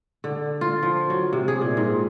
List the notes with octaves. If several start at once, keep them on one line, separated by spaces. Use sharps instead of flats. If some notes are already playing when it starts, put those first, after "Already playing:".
D3
F4
F3
F#3
C3
G#4
A#2
G#2